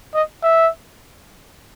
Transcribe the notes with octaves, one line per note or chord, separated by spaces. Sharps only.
D#5
E5